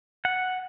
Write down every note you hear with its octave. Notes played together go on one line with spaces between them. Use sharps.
F#5